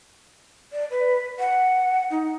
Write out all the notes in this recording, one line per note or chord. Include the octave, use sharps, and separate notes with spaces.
D5
B4
F#5
D#4